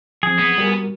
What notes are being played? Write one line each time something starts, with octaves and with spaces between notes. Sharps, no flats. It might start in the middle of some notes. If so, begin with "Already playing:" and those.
F3 C4 G#4
B3
G3 F#4 A#4